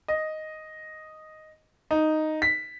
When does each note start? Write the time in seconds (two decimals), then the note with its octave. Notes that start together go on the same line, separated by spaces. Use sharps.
0.08 D#5
1.91 D#4
2.42 B6